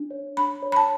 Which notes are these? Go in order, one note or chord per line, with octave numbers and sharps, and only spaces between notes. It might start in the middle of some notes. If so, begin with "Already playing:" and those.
Already playing: D4
C#5
D4 B5
C#5
B5
A5